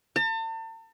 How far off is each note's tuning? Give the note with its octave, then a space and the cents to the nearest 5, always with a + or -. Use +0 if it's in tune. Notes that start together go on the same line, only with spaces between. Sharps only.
A5 +40